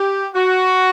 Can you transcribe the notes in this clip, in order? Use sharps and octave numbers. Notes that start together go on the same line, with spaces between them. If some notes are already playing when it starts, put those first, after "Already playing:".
Already playing: G4
F#4